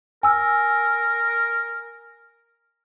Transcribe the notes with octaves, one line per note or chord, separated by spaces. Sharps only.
A#4 G#5 E6